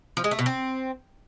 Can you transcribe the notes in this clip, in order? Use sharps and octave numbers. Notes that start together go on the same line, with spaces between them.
F3
G#3
A3
B2
C4